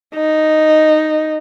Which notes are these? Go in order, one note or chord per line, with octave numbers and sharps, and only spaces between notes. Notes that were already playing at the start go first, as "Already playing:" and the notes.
D#4